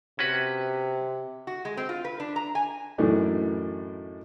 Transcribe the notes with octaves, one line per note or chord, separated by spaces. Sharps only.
C3 C#4 F#4 B4
F#4
G#3
C4
F4
B4
D4
A#5
G#5
F#2 A2 E3 D4 D#4